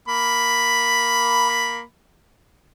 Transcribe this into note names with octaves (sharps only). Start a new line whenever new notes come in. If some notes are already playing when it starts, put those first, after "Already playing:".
A#3 B5